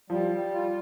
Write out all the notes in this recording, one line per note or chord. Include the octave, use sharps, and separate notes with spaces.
F3 G3
G3
F4